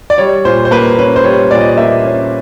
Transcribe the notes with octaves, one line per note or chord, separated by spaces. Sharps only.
D5
G3 C#5
A#2 C5
C5
A#3 B4
C#4 B4
C5
G3 C#5
A#2 D5
D#5
D5
A#3 E5
C#4